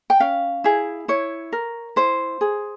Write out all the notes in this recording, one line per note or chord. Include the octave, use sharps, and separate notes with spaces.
G5
C#4 F5
E4 G#4
E4 C#5
A#4
E4 C5
G#4